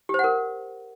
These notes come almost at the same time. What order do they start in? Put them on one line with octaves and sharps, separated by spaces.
G4 C5 F#5 A#4